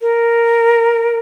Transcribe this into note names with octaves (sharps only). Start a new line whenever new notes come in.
A#4